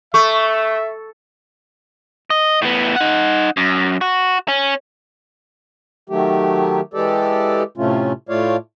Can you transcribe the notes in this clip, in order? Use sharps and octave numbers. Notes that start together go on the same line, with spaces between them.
A3 E5 C#6
D#5
A2 B3
D#4 F#5
F#2
F#4
C#4
D#3 F#3 A3 G4
E3 G#3 G4 A4 D5
A2 C3 A3 C#4 F4
A2 A3 F4 C#5 D5 F5